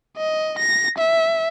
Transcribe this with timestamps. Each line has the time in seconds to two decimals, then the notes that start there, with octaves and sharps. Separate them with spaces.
0.17 D#5
0.59 A#6
0.98 E5